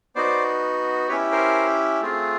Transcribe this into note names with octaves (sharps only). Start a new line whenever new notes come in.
B3 D#4 F#4 C5 D5
C#4 E4 G4 B4 C#5
A#4 C5
A3 C4 F4 G#4